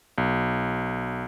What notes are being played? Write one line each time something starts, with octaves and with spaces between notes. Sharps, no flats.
B1